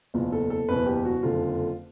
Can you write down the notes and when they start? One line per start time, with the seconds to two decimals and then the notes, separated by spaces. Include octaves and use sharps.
0.14 F#1 E2 B2 F4
0.32 A4
0.50 A4
0.69 F#1 E2 B2 B4
0.86 G4
1.05 F#4
1.23 F#1 F2 D3 F4